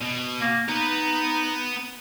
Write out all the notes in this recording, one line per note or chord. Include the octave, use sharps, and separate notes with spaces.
B2
A#3
B3 D#4 B4